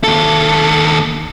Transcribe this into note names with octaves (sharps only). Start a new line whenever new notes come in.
D#2 A4